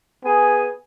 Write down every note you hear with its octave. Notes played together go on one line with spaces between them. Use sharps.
B3 G#4 G#5